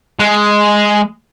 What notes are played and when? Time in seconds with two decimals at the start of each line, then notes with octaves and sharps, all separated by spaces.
0.20 G#3